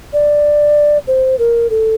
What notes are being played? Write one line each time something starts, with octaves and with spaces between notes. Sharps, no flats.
D5
C5
A#4
A4